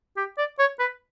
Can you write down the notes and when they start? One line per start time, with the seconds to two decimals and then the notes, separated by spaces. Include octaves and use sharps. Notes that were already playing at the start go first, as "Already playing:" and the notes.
0.17 G4
0.38 D5
0.59 C#5
0.79 B4